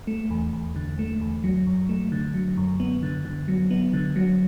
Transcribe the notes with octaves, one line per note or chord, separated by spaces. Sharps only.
A3
E2
E2
D3
A3
E2
F#3
F#2
A3
D3
F#3
F#2
B3
D3
D3
F#3
B3
D3
F#3